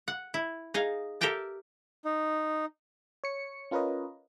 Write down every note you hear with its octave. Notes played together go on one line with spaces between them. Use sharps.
F#5
E4
D#4 G#4 F5
G4 A4 A#4 E5 G5 A5
D#4
C#5 C#7
C#4 F4 A#4 B4 C#5 D#5